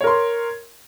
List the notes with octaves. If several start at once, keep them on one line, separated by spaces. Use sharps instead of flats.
A#4 C#5 C6